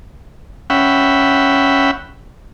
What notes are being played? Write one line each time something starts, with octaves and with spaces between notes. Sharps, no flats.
C#4 E5 F#5 G5 B5